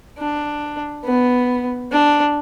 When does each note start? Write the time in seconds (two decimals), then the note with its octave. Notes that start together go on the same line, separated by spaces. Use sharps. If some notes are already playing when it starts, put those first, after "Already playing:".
0.18 D4
1.05 B3
1.92 D4